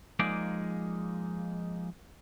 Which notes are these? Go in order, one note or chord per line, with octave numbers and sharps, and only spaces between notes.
F3 G#3 A#3 D#4 G#4 D5